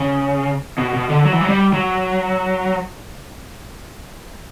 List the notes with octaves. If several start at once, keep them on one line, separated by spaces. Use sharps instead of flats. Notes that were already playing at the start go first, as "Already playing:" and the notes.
Already playing: C#3
B2
B2
D3
F#3
E3
F#3
G3
F#3